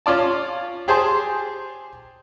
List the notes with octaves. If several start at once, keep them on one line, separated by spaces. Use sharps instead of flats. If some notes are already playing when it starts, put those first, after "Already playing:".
C#4 F4 D5 A5
G4 G#4 C5 G#5 A5 C6